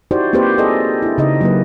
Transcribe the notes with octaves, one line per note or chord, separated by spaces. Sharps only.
D#4 E4 F#4 G4 C5 D5
A#3 C4 F4 G4 B4 C5
G#4 A4 D5 D#5
D4 E4
C#3 D#4 D#5
F#3 A#3 B4